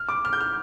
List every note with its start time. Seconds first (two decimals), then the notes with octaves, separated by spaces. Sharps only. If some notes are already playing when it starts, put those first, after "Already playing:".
Already playing: F6
0.09 D6
0.25 F6
0.33 G6
0.41 F6